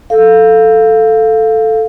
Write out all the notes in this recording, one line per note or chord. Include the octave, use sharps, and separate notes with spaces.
A4 F5